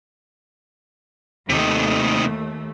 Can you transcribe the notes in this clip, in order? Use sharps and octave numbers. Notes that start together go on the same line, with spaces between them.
D#2 C3 D#3 A3